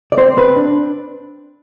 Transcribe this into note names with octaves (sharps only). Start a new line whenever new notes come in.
D5
C4 C5
C4 B4
D4